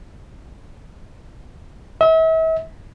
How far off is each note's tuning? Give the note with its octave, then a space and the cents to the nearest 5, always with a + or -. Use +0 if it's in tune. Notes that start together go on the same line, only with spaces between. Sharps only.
E5 -40